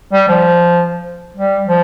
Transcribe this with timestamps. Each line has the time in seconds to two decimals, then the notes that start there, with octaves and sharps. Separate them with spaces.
0.13 G3
0.29 F3
1.37 G3
1.68 F3